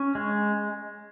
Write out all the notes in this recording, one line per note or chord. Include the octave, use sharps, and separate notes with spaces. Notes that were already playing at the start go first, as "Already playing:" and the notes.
Already playing: C#4
G#3